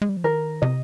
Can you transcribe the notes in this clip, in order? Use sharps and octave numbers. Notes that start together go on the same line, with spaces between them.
G#3
G3
F3
D#3 A#4
C3 D#5